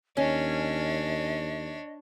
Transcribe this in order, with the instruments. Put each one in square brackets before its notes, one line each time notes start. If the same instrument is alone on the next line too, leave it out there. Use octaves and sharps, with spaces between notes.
[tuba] D#2 [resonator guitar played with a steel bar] C#4 [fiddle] D4 C#5 [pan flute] D#5